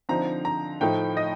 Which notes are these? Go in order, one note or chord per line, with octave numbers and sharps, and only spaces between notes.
D3 F3 C4 D#4 A#5
A#5
A2 F3 A3 D#4 G5
D#5